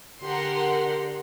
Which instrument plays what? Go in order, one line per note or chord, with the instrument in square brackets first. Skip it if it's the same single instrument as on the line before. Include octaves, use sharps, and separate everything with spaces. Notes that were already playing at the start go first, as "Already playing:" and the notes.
[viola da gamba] D3 G4 [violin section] A#4 F#5 C6